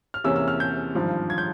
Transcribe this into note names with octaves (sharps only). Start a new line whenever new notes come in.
F6
E2 C3 E3 A#3 C#4 E6
E6
F6
G6
G#1 G2 F3
G#6
G6